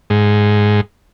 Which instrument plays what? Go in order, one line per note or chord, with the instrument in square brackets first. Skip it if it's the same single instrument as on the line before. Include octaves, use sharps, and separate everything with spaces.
[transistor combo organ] G#2